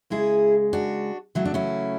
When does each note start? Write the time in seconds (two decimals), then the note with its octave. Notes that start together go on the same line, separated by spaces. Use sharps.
0.10 C#3 G#3 E4 G#4
0.73 D4 F#4
1.35 C#3 F#3 A3 E4
1.45 D4
1.54 C#4 E4